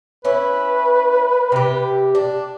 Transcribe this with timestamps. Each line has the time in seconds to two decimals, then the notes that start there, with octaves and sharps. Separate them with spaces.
0.25 C#4 E4 B4
1.52 C3 G4
2.15 D4